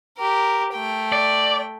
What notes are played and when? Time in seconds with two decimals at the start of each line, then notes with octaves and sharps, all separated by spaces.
0.18 G4 A#4
0.73 A3 G5
1.12 D5